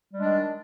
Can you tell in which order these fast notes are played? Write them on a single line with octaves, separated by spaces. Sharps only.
G3 G#3 D4 D#3